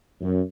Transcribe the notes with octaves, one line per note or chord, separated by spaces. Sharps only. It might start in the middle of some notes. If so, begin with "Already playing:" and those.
F#2